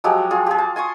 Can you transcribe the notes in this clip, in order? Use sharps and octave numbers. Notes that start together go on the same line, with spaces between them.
F3 F#3 G#3 G4
F4 G#4
G4 G#4
A5
G#5 C6 C#6 D#6